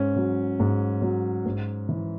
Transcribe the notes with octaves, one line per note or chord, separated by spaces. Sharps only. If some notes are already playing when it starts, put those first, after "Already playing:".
Already playing: G#2 C#4
F#3
G#2
F#3
G#2
E3